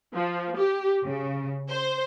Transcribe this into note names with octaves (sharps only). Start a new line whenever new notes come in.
F3
G4
C#3
C5